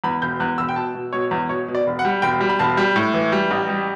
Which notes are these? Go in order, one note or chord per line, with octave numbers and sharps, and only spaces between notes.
E2 B5
E1 G6
E2 F#6
E1 E6
G5
B2 A5
B2
B2 C#5
E2
B2 C#5
B2
D5
E1
F#5
G3
E1 G5
G3
B5
E1 A5
G3
A2
E3
G3
A1
G3